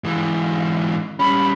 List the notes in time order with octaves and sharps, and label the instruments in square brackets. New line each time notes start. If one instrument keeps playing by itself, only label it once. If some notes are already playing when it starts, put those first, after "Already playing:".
[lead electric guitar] G#2 E3
[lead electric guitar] G3 C#4 [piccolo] B5